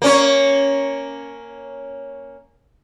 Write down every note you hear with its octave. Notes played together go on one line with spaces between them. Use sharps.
A#3 C#4 C#5